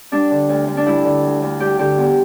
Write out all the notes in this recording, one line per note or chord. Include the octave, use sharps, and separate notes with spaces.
G3 D4
D3
D2
D2
D4
G3 E4
D3
D2
D2
G3 G4
D3 G4
E2